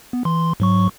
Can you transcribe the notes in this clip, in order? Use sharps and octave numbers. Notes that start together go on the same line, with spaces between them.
B3
E3 C6
G#2 F#3 C#6